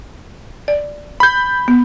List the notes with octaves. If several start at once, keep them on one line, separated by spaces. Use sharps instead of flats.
D5
B5 G6
B3